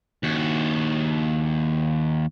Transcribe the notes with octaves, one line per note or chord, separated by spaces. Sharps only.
D#2 F#4